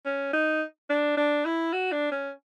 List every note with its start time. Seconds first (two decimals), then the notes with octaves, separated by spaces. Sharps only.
0.05 C#4
0.33 D#4
0.90 D4
1.17 D4
1.45 E4
1.73 F#4
1.92 D4
2.12 C#4